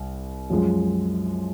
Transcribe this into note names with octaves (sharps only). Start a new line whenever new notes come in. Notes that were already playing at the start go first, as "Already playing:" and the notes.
Already playing: C2
F#2 F3 G#3